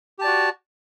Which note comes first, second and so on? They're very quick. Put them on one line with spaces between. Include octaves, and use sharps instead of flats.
G4 A5 D5 F#4